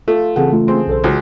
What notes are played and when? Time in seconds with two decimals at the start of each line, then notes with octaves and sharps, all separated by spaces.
0.08 A3 F4
0.36 C#3 E3 C4 G#4 A4 F#5
0.53 A3 F4
0.68 C4 G#4
0.87 B1 A4 C5
1.04 C#2 F#3